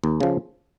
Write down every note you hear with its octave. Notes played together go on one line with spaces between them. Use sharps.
D#2
C#3 F3